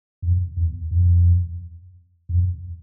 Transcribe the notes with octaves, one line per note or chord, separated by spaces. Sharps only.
F2
E2
F2
F2